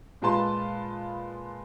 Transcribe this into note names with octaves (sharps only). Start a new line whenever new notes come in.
A#2 G#3 F4 B4 A5 C6